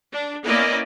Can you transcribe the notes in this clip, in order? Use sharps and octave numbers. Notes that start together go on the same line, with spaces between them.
D4
A#3 B3 C#4 E4 D5 D#5